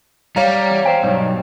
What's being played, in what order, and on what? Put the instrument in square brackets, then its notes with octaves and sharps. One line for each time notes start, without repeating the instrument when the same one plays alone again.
[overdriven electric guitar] G3 [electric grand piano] C#5 F5 A#5
[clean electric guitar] E2
C5 G5
[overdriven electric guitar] B1 [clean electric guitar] G2 G3